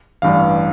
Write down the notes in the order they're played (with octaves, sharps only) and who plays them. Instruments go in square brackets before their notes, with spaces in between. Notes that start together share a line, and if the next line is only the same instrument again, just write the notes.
[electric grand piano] A1 G2 E3 G3 F5